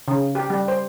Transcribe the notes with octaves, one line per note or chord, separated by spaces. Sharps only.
C#3
G4
G3
C5